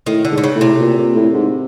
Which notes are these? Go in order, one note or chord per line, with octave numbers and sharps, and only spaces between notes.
A2 D#3
D3
G#2
D3
C#3
A2
C3
A#2
A#2
A2
G#2